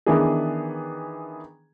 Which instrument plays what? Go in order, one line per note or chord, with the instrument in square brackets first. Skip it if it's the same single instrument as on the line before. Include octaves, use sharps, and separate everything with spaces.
[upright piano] D#3 E3 B3 D4 G#4